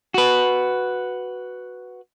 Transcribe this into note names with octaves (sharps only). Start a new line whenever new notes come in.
F#4 B4